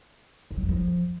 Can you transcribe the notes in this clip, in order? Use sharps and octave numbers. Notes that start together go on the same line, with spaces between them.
C#3
F#3
F2
F3